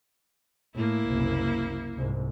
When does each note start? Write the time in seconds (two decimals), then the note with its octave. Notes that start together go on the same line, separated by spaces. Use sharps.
0.75 A2 A#3 E4
1.08 F#1 C2
1.97 C2 G#2